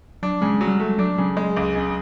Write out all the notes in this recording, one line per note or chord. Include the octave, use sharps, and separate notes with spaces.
F#3 D4
C#3 G#3
F#3
G3
G#3 A3
F#3 D4
C#3 F#3
G#3
C#2
C#3